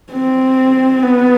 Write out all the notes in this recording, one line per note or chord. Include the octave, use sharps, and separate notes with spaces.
C4
B3